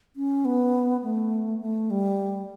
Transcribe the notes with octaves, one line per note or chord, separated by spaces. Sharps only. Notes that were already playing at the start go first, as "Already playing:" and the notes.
C#4
B3
A3
A3
G3